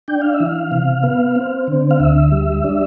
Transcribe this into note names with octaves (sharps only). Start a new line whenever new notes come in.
D4 G5
F5
E5
E3
F5
C3
B3
C4
D3
F5
D2 E5
G3
D4